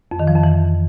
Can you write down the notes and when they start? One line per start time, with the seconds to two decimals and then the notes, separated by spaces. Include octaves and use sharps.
0.11 F2
0.19 D#3
0.27 F3
0.35 F2
0.43 E3